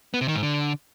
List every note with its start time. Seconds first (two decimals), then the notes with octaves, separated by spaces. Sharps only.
0.14 B3
0.21 C3
0.28 D#3
0.36 G#2
0.43 D3